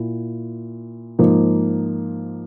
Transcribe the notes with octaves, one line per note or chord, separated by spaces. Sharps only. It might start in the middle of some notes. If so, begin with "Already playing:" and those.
Already playing: A#2 E4
G#2 F3 A#3